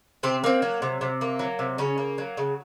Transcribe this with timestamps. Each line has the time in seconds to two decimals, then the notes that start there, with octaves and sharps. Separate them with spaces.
0.23 C3 C4
0.44 A#3 C4
0.62 F#3
0.82 C3
1.01 C3
1.21 A#3
1.39 F#3
1.59 C3
1.78 C#3 C#4
1.98 A#3
2.18 F#3
2.37 C#3